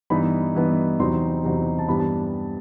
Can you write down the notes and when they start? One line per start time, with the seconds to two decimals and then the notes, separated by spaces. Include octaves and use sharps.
0.10 G2 E3 B3 D#4 B5
0.55 G2 E3 B3 D#4
0.99 E2 C3 F#3 C4 D#4 C6
1.44 E2 C3 F#3 C4 D#4
1.78 A5
1.88 G2 E3 G3 B3 B5
1.99 A5